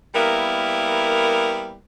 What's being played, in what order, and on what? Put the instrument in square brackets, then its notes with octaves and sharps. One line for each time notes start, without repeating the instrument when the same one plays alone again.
[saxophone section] G3 A#3 B3 E4 A#4